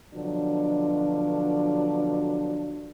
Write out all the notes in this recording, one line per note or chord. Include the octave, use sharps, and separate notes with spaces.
B2 D3 F3 F#3 D4